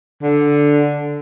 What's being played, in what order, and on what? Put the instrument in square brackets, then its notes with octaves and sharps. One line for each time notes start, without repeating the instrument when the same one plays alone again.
[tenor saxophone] D3